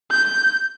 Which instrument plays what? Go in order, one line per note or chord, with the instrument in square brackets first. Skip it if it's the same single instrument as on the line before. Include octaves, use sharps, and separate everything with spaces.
[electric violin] G6